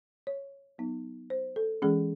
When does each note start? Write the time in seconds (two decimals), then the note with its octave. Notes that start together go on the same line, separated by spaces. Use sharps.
0.27 C#5
0.78 F#3 B3 D#4
1.30 C5
1.56 A4
1.82 E3 G#3 C#4 G#4